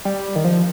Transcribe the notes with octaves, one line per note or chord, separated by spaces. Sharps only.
G3
D#3
F3